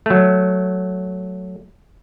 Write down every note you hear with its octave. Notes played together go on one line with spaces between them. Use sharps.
F#3 A3